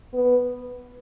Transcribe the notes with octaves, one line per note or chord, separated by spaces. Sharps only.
B3